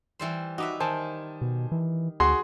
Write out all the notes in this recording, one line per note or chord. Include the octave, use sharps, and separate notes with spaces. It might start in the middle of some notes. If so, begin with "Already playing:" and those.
E3 G3 C5
D#4 F#4 B4 E5 D6
D#3 C5 G#5 A5
B2
E3
D2 F#4 G#4 C6